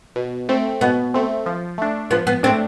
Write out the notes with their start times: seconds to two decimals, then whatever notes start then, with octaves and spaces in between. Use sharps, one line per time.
0.16 B2
0.49 A3 C4
0.81 B2 B3
1.14 A3 C4
1.46 F3
1.78 A3 D4
2.11 F3 B3
2.27 B3
2.43 A3 C4 D4